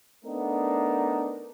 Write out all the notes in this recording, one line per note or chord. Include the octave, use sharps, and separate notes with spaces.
A3 B3 D4 D#4 A#4